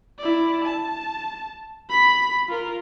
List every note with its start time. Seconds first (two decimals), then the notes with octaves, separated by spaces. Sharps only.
0.19 E4 D5
0.64 A5
1.90 B5 B6
2.49 F4 A#4